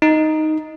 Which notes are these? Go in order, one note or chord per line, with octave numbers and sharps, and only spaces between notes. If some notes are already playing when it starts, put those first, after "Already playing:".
D#4